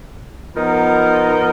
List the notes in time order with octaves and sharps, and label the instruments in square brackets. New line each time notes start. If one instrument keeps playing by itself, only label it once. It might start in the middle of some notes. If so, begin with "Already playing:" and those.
[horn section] F3 B3 D#4 A#4